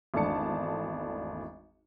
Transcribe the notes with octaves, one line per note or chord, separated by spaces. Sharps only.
G#1 E2 A3 D4 A5 C#7